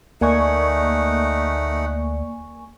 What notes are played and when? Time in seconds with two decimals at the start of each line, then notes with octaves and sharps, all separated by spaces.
0.21 D2 A3 A#3 D#4 D5 F#5 G#5 C#6